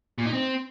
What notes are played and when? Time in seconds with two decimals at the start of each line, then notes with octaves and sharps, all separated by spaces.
0.18 A#2
0.26 D#4
0.33 C4